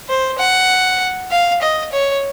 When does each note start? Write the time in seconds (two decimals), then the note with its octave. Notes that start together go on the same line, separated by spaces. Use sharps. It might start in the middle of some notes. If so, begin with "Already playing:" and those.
0.09 C5
0.39 F#5
1.31 F5
1.61 D#5
1.92 C#5